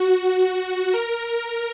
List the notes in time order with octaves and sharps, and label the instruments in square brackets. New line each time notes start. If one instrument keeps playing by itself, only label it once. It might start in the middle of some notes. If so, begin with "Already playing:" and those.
Already playing: [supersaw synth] F#4
A#4